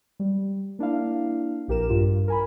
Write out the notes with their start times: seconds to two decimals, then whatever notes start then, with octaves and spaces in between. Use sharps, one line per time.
0.20 G3
0.79 A#3 D4 E4 F5
1.68 A#1 G4 A#4 E7
1.89 G2 F4
2.28 A#4 G#5 B5